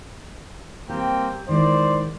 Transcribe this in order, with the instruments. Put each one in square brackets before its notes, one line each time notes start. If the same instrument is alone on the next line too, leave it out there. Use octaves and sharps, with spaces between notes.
[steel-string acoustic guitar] G3 G4 [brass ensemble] A#3 C4 G5
[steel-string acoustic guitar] D#3 G#3 E4 [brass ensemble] C5 D5